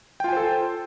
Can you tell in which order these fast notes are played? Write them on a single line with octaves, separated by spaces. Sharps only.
G5 F4 G#5 C5 A4